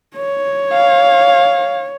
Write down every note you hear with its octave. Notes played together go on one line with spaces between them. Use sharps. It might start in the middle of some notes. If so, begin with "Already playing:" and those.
C#5
F5